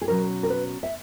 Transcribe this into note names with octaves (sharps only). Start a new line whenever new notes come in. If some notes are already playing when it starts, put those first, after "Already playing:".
G#4
B2 F#3 C#4 A#4
A#4
B4
E5